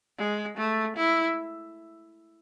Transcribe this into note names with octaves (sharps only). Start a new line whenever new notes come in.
G#3
A3
E4